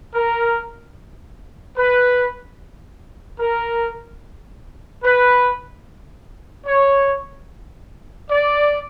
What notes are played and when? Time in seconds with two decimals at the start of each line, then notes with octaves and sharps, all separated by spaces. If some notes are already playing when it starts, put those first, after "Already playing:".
0.14 A#4
1.76 B4
3.40 A#4
5.03 B4
6.66 C#5
8.29 D5